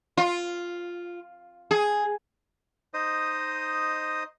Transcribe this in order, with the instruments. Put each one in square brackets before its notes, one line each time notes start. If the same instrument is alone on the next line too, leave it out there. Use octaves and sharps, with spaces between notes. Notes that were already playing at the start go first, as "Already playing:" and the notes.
[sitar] F4
G#4
[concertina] D#4 C5 D#5 D#6